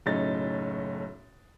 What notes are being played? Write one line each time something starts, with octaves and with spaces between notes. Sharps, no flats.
F#1 B1 A2 C#4 D#4 A6